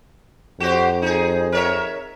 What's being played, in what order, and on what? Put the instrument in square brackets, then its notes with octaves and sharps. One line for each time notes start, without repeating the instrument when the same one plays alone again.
[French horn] F2 [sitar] F#4 G4 C5
[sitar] D#4 G#4
A#4 C#5 E5